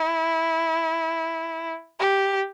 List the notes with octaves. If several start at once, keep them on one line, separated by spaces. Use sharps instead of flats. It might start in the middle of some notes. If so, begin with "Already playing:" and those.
Already playing: E4
G4